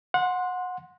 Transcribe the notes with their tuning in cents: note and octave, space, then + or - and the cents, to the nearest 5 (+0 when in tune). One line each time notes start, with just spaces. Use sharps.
F#5 -25 C6 +0